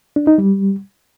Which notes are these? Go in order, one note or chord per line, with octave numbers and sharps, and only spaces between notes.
D4
D#4
G3